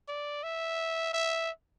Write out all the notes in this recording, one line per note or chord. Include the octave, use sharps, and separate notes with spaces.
D5
E5
E5